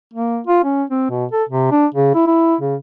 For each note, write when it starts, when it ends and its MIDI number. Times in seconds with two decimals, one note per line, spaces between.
0.14 0.40 58
0.47 0.62 65
0.64 0.84 61
0.90 1.06 60
1.10 1.25 47
1.32 1.44 69
1.49 1.70 48
1.71 1.86 62
1.95 2.10 49
2.15 2.24 64
2.27 2.55 64
2.61 2.75 49